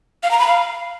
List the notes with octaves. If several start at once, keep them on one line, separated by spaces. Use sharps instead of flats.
F5
A#5
B5
F5